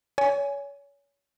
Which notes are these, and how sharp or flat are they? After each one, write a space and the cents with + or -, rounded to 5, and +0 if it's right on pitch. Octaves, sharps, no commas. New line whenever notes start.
C#5 +30 G#5 +0